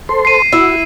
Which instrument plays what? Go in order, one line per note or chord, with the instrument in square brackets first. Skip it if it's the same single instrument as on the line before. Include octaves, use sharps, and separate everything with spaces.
[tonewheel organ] A4 C5 C6
[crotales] C7 D#7
[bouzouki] E4 [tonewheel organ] F#4